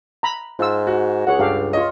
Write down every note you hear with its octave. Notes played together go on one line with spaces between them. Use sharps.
A#5 B5
G#2 F4 E6
F#4
C#2 G#4 C#5 F#5
G2 G4 A4 F5
F4 C#5 D#5